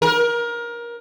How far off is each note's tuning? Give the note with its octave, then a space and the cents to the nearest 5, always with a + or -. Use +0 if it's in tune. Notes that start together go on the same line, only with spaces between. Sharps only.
A#4 +25